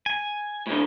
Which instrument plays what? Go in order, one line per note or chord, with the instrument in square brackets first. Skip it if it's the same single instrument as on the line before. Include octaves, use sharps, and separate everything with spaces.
[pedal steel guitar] G#5
[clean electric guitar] A2 D3